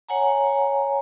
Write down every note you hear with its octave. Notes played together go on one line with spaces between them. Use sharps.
C#5 F#5 G#5 A#5